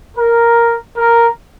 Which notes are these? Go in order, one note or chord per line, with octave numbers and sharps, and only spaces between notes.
A#4
A#4